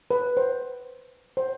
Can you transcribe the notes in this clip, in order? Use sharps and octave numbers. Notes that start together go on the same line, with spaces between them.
B4
C5
C5